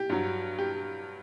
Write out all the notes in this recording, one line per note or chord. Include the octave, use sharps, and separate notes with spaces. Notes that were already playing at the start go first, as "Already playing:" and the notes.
Already playing: G4
G2 F#3
G4